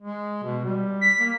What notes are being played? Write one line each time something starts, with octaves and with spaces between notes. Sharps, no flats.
G#3
B2
G3
B6
A#3